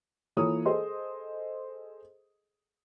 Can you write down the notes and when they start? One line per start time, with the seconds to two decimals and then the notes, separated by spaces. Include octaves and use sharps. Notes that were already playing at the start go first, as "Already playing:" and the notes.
0.37 E3 A#3 F4 A4 C#5 D#6
0.65 G#4 A4 C5 D#5 C6